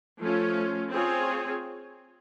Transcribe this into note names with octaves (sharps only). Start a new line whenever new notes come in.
F3 A3 C#4 F4
C4 F4 G#4 C#5